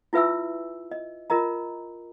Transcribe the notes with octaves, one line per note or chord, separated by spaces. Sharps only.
E4 F4 B4 E5 G#5 E6
D#5
F4 A#4 D#5 A#5